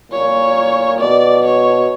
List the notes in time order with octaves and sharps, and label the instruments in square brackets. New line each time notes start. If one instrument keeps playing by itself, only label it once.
[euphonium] A#2 [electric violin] C#5
[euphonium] B2 [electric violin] D5
[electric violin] C#5